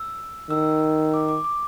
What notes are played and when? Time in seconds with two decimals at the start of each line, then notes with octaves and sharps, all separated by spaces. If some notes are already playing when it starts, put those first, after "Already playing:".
Already playing: E6
0.50 D#3 E6
1.14 D6
1.29 D6
1.44 D6